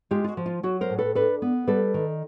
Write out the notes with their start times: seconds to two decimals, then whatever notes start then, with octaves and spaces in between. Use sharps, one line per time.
0.11 G#3 F4 G4
0.24 F4
0.29 F#4
0.37 F3
0.46 F4
0.63 F#3 F#4
0.81 A#4 C5
0.90 A2
0.98 A4 B4
1.15 D4 A4 B4
1.42 B3
1.67 G3 A4 B4
1.94 D#3